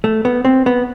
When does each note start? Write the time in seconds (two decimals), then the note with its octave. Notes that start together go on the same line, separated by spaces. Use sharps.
0.04 A3
0.25 B3
0.45 C4
0.66 B3